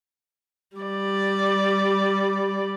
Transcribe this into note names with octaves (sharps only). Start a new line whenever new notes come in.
G3 D5